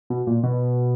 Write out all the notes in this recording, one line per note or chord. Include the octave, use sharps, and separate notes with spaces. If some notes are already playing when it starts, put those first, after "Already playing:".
B2
A#2
B2